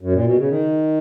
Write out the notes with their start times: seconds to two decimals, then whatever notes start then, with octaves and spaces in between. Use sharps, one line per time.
0.01 F#2
0.13 A#2
0.24 B2
0.37 C#3
0.49 D#3